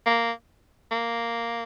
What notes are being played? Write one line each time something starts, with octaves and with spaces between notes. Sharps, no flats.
A#3
A#3